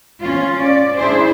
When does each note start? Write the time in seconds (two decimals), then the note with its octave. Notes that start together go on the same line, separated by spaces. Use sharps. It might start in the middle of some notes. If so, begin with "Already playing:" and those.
0.20 C#4 F4
0.62 D5
0.96 D4 E4 G#4 C5